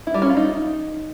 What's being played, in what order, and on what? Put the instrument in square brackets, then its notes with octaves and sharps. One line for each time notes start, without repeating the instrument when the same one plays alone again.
[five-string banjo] E4
G3
C#4
F4
D#4